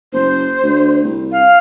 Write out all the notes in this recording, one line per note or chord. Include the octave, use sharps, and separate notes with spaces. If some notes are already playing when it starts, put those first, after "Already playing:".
F#1 C5
D2
C2
F5